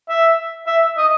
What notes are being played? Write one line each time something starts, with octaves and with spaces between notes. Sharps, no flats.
E5
E5
D#5